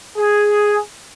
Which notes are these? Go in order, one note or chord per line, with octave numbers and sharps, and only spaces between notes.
G#4